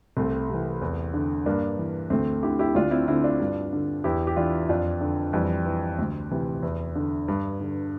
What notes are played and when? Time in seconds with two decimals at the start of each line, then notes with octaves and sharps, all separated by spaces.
0.17 C2 A3 C4
0.50 C3 E3
0.82 E2
1.14 D3
1.46 G2 A#3 D4
1.78 E3
2.10 D2 A3 C4
2.43 D3 E4 G4
2.59 E4 G4
2.75 D2 D4 F4
2.91 C4 E4
3.08 D3 C4 E4
3.24 D4 F4
3.40 G2
3.72 D3
4.04 E2 E4 G4
4.27 G4
4.36 E3 D4 F4
4.69 F2 D4 F4
5.01 D3
5.33 F2 E3 G3
5.66 E3
5.99 D2
6.31 C3 E3
6.63 E2
6.95 D3
7.28 G2
7.60 D3